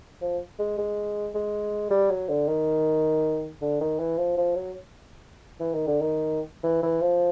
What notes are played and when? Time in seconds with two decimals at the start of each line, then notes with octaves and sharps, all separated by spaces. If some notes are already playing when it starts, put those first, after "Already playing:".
0.21 F3
0.59 G#3
0.78 G#3
1.35 G#3
1.91 G3
2.11 F#3
2.29 D3
2.48 D#3
3.61 D3
3.81 D#3
3.99 E3
4.18 F3
4.37 F3
4.56 F#3
5.60 E3
5.74 D#3
5.87 D3
6.01 D#3
6.64 E3
6.83 E3
7.02 F3